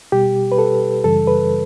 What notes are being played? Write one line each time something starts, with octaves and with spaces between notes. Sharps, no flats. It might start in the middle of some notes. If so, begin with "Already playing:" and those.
B2 G3 G4
B4
A4
F#2 C#3 E3 G3 A4
B4